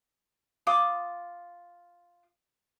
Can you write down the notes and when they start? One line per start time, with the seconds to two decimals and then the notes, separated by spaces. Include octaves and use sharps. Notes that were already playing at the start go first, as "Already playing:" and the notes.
0.67 F4 D6 D#6